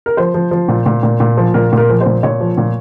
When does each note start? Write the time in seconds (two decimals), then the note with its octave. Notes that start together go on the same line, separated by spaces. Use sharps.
0.06 A#4
0.17 F3 C5
0.34 F3
0.51 F3
0.68 A#2
0.86 A#2
1.03 A#2
1.20 A#2
1.37 F3
1.54 A#2 A#4
1.72 A#2
1.77 A#4
1.89 F3
2.01 C5
2.06 A#2
2.23 A#2 C#5
2.41 F3
2.58 A#2